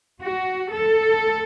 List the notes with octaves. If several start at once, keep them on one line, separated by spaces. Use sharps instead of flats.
F#4
A4